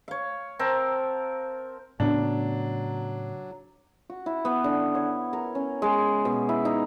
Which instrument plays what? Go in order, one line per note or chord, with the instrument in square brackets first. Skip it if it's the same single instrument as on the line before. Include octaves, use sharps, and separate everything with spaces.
[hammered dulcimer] C#5 F5
C4 A#4 A5
[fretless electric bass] A2 C#3 B3 [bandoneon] F#3 [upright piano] D4
[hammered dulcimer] F#4
E4
B3
D3
C#5
A#4
C#4
G#3
B2
E4
D#4